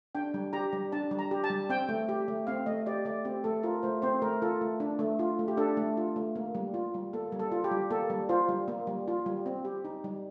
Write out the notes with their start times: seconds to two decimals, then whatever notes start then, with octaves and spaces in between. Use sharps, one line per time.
0.15 D4 G5
0.34 G3
0.53 G4 A#5
0.73 G3
0.92 D4 A5
1.11 G3
1.19 A#5
1.31 G4
1.44 A5
1.50 G3
1.69 C4 G5
1.89 A3
2.09 G4
2.28 A3
2.47 C4 F5
2.66 A3 D#5
2.86 G4 D5
3.05 A3 D5
3.25 C4 G4
3.44 A3 A4
3.63 F4 A#4
3.83 A3 C5
4.02 C4 C5
4.22 A3 A#4
4.42 F4 A4
4.61 A3
4.80 D4
4.99 A3
5.19 F4
5.39 A3
5.48 G4
5.57 D4 A4
5.77 A3
5.97 F4
6.16 A3
6.36 A#3
6.55 G3
6.74 F4
6.94 G3
7.13 A#3 A4
7.32 G3
7.40 A4
7.52 F4
7.64 G4
7.71 G3
7.90 A#3 A4
8.10 G3
8.29 F4 C5
8.49 G3
8.68 A#3
8.87 G3
9.08 F4
9.26 G3
9.46 C4
9.65 G4
9.85 D#4
10.04 G3